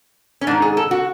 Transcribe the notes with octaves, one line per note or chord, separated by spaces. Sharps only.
C#4
G#2 D#3 D4
G#4
A4
F#4